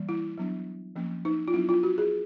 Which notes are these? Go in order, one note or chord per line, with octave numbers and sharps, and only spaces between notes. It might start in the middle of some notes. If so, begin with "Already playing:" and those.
Already playing: E3 G3 A#3
E4
F#3 B3 D4
F3 A#3 C#4
D#4
F4
F#3 B3 D4 E4
F4
F#4
G#4